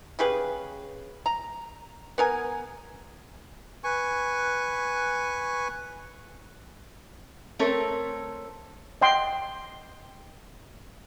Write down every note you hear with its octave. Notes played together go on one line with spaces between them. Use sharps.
C#3 G4 G#4 B4
A#5
B3 A#4 G#5
B4 G#5 C#6
A3 C4 A4 A#4 C#5
D#5 F#5 G5 C6